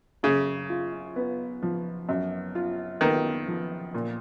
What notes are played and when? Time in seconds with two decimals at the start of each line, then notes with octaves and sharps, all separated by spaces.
0.23 F#2 C#3
0.70 F4
1.16 B3
1.63 F3
2.09 F#2
2.55 F4
3.01 D#3 B3
3.47 F3
3.94 A#2